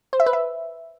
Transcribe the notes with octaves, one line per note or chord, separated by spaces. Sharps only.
C5
E5
B4
E5